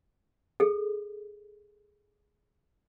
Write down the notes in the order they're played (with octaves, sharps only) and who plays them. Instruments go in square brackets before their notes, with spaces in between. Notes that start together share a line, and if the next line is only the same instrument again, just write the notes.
[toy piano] G#4 A4